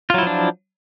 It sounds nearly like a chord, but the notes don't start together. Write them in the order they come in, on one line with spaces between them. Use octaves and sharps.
F4 F#3 E4 F3 D4